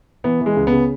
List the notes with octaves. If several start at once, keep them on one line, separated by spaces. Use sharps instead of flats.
E3 B3
E3
G#3
C#2
B3
C#3